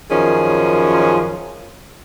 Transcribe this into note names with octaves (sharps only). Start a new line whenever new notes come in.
F#2 D#3 F3 C#4 G#4